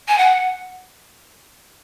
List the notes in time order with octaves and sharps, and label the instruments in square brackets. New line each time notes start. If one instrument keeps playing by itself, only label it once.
[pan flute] G#5
F#5